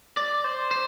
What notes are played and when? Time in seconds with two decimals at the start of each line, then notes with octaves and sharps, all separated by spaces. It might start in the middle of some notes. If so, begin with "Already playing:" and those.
0.17 D5
0.44 C5
0.71 C5